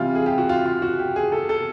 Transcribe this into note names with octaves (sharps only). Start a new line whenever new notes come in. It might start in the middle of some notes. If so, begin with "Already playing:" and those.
Already playing: C3 E3 G3 F4
G#4
G4
F#4
F4
F4
F#4
G4
G#4
A4
A4